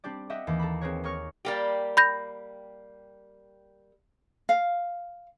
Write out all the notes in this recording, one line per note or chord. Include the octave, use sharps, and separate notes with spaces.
G3 C4 D4 G4 D5
G4 D#5 E5 F#5 D6
D#2 E3
A4 A#5 B5
C4 G#4 A#4 B4 C#5
D#4 A#4 C#5 C#6 F6 C#7
G3 A#3 G4
B5 G6 A#6
F5